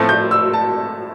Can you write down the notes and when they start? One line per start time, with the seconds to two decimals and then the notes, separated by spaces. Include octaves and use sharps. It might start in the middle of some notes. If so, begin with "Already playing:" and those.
Already playing: A2 F3 A3 C4
0.09 G6
0.31 E6
0.53 A5